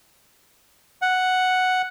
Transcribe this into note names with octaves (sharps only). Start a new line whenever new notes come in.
F#5